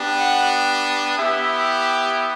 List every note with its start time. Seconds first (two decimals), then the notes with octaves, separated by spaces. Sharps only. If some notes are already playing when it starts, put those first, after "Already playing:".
Already playing: B3 D4 G4
0.17 F#5
1.16 B3 E4 G4 E5